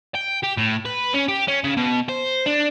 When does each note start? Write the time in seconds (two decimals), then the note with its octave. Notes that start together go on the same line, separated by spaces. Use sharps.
0.15 G5
0.43 G4
0.57 A2
0.85 B4
1.14 C#4
1.28 G4
1.48 C#4
1.64 C#3
1.77 B2
2.09 C5
2.46 D4